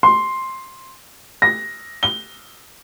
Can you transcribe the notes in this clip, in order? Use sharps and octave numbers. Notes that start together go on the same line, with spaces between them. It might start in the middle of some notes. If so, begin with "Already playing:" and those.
C6
A#6
G7